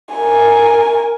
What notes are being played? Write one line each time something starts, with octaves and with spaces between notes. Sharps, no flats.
A#4 G#5